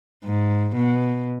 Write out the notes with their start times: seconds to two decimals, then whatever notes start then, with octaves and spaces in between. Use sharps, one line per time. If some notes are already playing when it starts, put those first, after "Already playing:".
0.24 G#2
0.76 B2